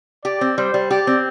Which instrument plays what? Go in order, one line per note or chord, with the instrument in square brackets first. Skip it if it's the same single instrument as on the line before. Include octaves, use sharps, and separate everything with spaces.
[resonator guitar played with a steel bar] G4 [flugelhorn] D5
[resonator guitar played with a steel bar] C4
[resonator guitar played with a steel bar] G3 [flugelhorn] C5
[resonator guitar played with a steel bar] G3
[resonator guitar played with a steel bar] G4 [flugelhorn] D5
[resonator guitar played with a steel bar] C4